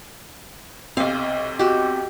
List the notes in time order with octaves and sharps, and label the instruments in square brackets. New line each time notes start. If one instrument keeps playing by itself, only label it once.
[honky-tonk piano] B1 C3 [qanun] F5
[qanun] F#4 G4